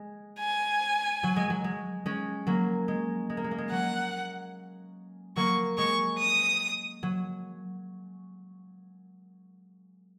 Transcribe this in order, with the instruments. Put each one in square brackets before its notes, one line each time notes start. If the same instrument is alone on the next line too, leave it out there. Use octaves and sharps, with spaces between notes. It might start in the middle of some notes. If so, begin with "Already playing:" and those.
Already playing: [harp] G#3
[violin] G#5
[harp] F#3
G#3
F#3
G#3
G#3 C#4
F#3 A#3
G#3
G#3
A#3
G#3
A#3
G#3
[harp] F#3 A#3 [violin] F#5
[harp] F#3 A#3 [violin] C#6
[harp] G#3 [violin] C#6
[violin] D#6
[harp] F#3